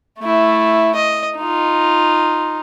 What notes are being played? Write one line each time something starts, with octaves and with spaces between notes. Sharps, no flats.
A3 E4
D#5
D#4 F4